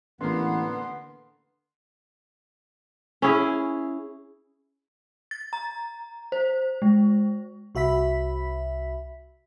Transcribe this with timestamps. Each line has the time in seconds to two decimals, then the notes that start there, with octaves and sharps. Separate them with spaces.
0.21 A1 D3 A#3 B3 C6
3.22 C#4 E4 G#4
5.31 A6
5.53 A#5
6.32 C5
6.82 G#3
7.75 C2 F#4 E5 B5 B6